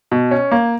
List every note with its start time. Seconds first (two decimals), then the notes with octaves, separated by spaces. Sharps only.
0.11 B2
0.31 C#4
0.51 A#3